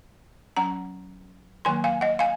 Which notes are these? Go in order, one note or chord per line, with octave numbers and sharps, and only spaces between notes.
F#3 C#4 F#5 A#5
D#3 F#3 A#3 G#5 C6
F5 G#5
D#5 F#5
F5 G#5